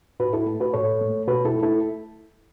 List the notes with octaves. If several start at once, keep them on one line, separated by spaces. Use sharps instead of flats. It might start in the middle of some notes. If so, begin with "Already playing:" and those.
A2 F#4 B4
E4 A4
A3
F#4 B4
A2 A4 C#5
A3
B2 F#4 B4
E4 A4
A3
E4 A4